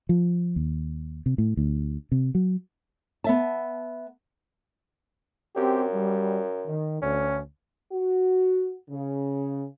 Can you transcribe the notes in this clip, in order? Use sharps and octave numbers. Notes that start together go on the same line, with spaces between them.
F3
D#2
C3
A2
D2
C3
F#3
B3 E5 A5
F#2 C4 G4
G3
D#3
D2 C#4
F#4
C#3